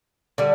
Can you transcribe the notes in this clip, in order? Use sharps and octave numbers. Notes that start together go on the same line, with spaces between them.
D3 G3